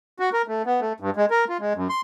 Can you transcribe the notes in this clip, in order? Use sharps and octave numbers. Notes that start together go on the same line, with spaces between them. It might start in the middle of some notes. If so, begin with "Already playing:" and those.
F#4
A#4
A3
B3
A3
G2
G#3
A#4
F4
G#3
F#2
C6